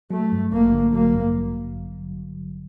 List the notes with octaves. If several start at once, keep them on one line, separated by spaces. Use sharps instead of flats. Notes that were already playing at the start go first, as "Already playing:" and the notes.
F#3 A3
G2
A1 A#3
D3
F#3 A#3
G2